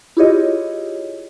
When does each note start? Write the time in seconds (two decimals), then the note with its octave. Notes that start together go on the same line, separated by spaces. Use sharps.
0.17 E4 F4 G4 G#4 C#5 D#5